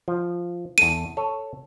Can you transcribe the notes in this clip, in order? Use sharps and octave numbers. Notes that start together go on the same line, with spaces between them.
F3
E2 A4 D#7
A4 C#5